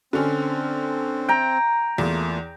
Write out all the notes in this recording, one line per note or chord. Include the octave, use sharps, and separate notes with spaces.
D3 C4 C#4
G5 A#5
E2 A3 A#3 F4